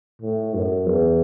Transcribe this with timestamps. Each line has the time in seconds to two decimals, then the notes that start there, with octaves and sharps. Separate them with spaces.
0.22 A2
0.54 F#2
0.86 E2